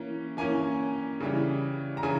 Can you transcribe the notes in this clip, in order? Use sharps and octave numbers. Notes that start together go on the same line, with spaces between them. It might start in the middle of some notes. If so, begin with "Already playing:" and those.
Already playing: E3 A#3 C#4
E3 A#3 C#4 G#5
C#3 E3 G3
A#5
C#3 E3 G#5